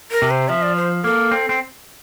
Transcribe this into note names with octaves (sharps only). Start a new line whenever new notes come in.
A#4
C3
C5
F3 E5
D5
C5
A#3 A4
C4
C4